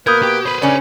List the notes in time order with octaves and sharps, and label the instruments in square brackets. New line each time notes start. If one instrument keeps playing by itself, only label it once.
[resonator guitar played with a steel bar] B2 [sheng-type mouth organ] A#3 B4 [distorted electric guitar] A#4 [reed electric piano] D#6 G6 G#6
[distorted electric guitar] G4
[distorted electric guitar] B4 C5 [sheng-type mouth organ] B5
[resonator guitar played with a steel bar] C#3 C#4 [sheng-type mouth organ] D5 G#5